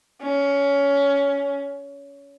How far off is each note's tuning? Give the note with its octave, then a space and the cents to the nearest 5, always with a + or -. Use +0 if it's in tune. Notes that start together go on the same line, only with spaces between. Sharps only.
C#4 +20